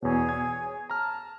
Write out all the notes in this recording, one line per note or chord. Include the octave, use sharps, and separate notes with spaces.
E2 B2 G#4 C#5 G#5
G#6
A5 A#5 F6